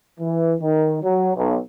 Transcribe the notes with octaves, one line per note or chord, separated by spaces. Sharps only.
E3
D#3
F#3
B1